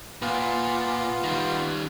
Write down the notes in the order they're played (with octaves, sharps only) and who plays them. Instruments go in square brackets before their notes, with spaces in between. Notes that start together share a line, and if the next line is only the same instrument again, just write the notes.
[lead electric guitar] A#2 [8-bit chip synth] B3 F4
[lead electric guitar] D#3 G3